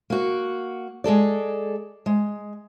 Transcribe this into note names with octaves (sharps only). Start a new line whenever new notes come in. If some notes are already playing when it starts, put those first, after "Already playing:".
A#3 F#4
G#3 G#4 A4 D5
G#3